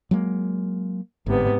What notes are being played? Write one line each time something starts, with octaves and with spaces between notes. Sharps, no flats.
F#3 G#3 A#3
G1 G#2 C3 B3